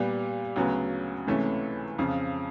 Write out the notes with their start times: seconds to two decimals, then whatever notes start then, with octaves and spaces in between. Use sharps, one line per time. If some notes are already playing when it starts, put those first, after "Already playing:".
Already playing: A#2 G3 B3
0.56 D2 C#3 F#3 B3
1.27 C#2 C3 E3 A3 C#4
1.99 F2 C#3 F3